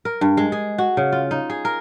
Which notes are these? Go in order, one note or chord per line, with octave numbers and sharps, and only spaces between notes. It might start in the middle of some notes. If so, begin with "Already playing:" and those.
A#4
G2
G#3
G#4
F#4
C#3
F4
D#4
G#4
A#4